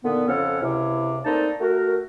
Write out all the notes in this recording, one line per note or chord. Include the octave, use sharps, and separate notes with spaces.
A#2 D3 D#3 B3
F2 C#3 F3 C#4 A4 F#5
C#2 C3 E4
A3 A#3 C4 D#4 D5 A5
A3 F#4 A#4